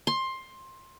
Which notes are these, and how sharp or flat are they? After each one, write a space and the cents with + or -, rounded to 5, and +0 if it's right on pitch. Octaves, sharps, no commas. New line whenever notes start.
C6 +15